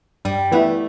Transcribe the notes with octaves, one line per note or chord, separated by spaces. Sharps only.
G2 G3
E3 A3 B3 E4